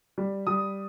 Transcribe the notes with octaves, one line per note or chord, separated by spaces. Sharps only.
G3
G3 D#6